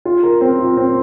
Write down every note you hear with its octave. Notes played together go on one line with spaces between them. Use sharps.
F4
A#4
C4
F4
C4